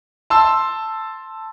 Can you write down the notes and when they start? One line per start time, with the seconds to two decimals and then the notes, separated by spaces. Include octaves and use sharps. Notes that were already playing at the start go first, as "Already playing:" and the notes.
0.30 A5 C6 E6